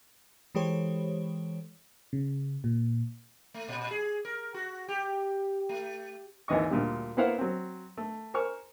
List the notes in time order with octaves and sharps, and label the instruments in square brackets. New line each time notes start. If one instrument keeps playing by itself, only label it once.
[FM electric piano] E3 G#3 G4 A4 C5 C#5
C#3
A#2
[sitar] A3
A#2
G#4
A#4
F#4
G4
A3
[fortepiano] G#1 D#2 E3 D#5 C#6
D2 A#2 D3 G3
A#3 B3 E4 C5 F5 F#5
F#3 C4
A3
A#4 C5 G#5 C#6 F6